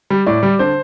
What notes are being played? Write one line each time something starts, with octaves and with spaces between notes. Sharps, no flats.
G3
A2 D5
G3
D3 C5